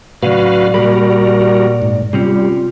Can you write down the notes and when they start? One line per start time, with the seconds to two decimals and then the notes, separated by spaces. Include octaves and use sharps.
0.23 A2 C#3 F#3 F#4 B4 D5 F5
0.74 A#2 G3 F#4 A#4 B5
1.82 G#2
2.13 C3 G3 C4 C#4 F4